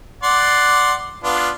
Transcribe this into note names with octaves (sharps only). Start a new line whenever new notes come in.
D5 F#5 C6
B3 D4 F4